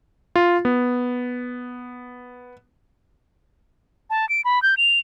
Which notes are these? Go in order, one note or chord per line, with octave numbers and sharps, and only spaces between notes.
F4
B3
A5
D7
B5
G6
F7